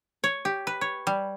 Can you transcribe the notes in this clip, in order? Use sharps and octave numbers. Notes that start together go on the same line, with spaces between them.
C#5
G4
B4
C#5
G3